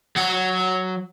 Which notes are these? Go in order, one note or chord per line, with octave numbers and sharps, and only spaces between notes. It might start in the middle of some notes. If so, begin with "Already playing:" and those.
F#3 F#5